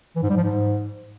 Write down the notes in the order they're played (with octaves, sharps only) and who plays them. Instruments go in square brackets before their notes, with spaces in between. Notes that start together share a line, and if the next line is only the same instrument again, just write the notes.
[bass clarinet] E3
G#2
G3
F3
G#2